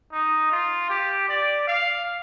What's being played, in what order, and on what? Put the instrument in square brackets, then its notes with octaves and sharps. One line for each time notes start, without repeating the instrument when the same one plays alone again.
[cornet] D#4
F4
G4
D5
F5